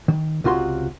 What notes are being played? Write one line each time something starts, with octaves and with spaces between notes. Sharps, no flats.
D#3
C#2 C3 F4 F#4 D#5 C6